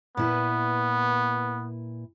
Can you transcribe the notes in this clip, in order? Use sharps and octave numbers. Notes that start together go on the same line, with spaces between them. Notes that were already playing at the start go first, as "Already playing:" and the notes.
A#2 B3 E4 B4